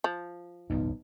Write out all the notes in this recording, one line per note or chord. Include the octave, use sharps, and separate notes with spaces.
F3
D1 B1 E2 B3 D#4